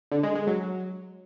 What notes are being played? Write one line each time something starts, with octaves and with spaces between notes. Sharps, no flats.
D3
G#3
G#3
F#3